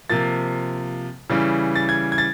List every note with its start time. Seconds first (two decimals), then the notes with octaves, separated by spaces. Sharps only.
0.09 C3 F3 A#3 A6
1.30 C#3 E3 G3
1.76 A6
1.89 G#6
2.12 G#6
2.18 A6